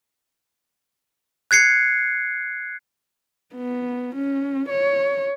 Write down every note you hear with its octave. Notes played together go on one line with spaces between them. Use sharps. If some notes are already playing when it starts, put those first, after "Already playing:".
F#6 G#6 C7 C#7
B3
C#4
C#5